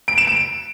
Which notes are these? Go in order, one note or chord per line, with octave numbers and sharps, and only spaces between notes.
D7
E7
D7